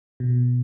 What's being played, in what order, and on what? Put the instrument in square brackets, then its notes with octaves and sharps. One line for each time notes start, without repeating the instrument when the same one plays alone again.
[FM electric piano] B2